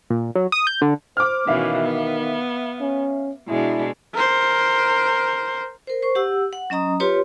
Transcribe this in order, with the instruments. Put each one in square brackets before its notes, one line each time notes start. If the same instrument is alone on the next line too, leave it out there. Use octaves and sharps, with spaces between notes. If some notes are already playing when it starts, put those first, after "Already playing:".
[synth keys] A#2
F#3
D#6
G6
D3
[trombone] C5 [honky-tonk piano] D6 F6
[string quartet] B2 E3 C#4 [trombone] D#3 [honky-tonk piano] E5 F5
[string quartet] B3
[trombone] C#4
[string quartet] B2 G#3 D4 [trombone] E4
[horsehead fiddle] A#4 C5
[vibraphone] A#4 C5
C5 C#6
G4 F#5 E6
F#5
F#3 C#4 D#5 A#5 D#6
F4 G4 B4 C#5 C6